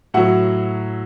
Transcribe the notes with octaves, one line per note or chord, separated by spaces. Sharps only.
A2 F#3 F#4 F#5